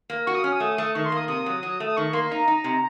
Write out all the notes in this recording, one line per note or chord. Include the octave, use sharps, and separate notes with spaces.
A#3
F#4 C#6
D#6
C#4 F6
D#6
A3
A3
D#3 C#6
C6
A#3 D#6
C3 D#6
F#3
F#3
A3
D#6
D#3 C#6
A#3 C6
C6
D#4 A#5
D#4
C3